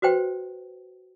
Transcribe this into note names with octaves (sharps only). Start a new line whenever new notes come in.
F#4 B4 C5 G5